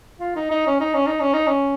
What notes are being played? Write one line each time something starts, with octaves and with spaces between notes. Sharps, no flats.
F4
D#4
D#4
C#4
D#4
C#4
D#4
C#4
D#4
C#4